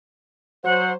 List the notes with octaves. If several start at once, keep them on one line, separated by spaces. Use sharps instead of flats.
F#3 C5 F#5